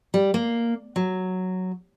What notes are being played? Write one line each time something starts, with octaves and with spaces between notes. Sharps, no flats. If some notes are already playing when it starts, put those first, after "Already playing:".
G3
A#3
F#3